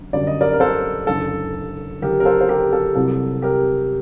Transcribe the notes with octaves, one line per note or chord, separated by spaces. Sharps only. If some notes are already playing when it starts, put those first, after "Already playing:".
Already playing: F#2 D3 F#3
G1 F#2 D3 F#3 D5
D#5
A#4 D5
A#4
A4 C5
F#1 F#2 D3 A4
F#1 F#2 D3 G4 A#4
A#4
A4 C5
C5
G4 A#4
A4
C2 C3 F#3 A4
G4 A#4